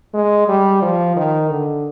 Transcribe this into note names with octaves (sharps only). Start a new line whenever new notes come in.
G#3
G3
F3
D#3
D3